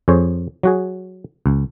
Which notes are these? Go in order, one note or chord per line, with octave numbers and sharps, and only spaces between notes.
F2 G#4 C5 C#5
F#3 F#4 G#4
C#2